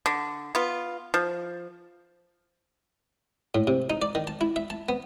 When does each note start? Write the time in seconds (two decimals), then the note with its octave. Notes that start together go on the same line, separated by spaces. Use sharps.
0.06 D3
0.55 B3 F4
1.14 F3
3.55 A2
3.67 C3
3.90 D#4
4.02 D5
4.15 D#3
4.27 A5
4.41 E4
4.56 E5
4.70 A5
4.89 B3